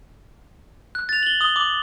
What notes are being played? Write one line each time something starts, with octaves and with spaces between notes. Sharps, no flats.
F#6
A6 F7
F#7 G7
D#6 G7
D6 F#7